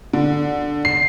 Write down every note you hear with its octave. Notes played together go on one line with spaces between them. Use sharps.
D3
C7